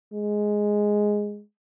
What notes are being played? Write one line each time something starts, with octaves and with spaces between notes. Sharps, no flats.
G#3